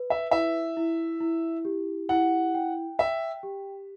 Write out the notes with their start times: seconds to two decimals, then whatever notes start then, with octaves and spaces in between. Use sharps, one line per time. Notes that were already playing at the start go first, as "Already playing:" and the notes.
Already playing: B4
0.10 E5
0.31 E4 E5
0.77 E4
1.21 E4
1.65 G4
2.09 E4 F#5
2.54 G5
2.99 E5 G5
3.43 G4